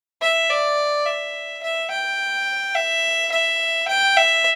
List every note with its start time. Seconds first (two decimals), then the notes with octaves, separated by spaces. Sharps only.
0.22 E5
0.49 D5
1.06 E5
1.63 E5
1.90 G5
2.75 E5
3.32 E5
3.88 G5
4.17 E5